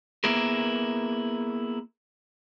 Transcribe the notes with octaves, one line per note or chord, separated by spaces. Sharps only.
A#3 B3 E4 G#4 A#4